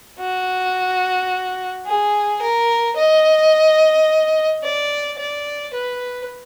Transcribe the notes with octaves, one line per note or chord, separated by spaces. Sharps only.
F#4
G#4
A#4
D#5
D5
D5
B4